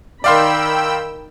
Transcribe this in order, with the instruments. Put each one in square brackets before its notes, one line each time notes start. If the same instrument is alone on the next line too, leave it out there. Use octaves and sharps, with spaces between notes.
[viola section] D#3 B5 [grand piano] D5 F5 C6 [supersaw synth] G5 E6